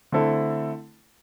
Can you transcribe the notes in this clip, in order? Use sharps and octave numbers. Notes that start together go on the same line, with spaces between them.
D3 A3 C4 E4 A4